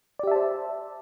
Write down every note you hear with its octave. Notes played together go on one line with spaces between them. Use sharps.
G4 C5 D5 E5 A5